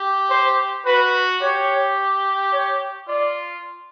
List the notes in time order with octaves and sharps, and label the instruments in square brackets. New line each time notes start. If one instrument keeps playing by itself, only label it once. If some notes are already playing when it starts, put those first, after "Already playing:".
Already playing: [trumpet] G4
[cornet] C5
[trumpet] F#4 [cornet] B4
[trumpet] G4 [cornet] C#5
[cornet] C#5
[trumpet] F4 [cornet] D5